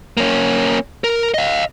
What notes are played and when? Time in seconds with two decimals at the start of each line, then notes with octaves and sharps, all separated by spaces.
0.17 A#3 C#4
1.04 A#4
1.34 D#5 F5